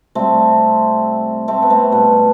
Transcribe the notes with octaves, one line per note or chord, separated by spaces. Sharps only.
C3 G3 A3 C4
A3 C4
B3
A3 C4
B2 G3 B3